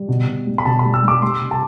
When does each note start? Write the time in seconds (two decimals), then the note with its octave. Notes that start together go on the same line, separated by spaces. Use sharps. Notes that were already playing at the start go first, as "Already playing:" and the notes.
Already playing: G3
0.09 B2
0.27 B2
0.47 G3
0.58 B5
0.65 B2 A5
0.79 B5
0.85 G3
0.94 E6
1.03 G3 D6
1.22 G3 C6
1.41 C3
1.51 A5